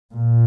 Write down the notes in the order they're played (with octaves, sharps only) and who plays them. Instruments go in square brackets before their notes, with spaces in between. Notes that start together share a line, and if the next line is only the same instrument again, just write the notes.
[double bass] A#2